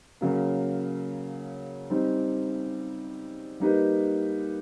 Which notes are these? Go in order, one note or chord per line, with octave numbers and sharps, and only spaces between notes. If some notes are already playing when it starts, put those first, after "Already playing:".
C#3 F#3 A#3
G3 C4 D#4
G3 A#3 D#4 G4 B4